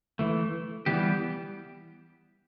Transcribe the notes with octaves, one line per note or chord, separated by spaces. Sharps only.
E3 A3
E3 G3 B3 G4